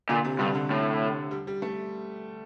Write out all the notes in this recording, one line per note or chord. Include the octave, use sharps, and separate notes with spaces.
A#2 D3
C3
G2 D3
D3
A2
G3
G3
A3